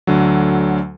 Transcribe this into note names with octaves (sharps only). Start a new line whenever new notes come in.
D2 D3 F#3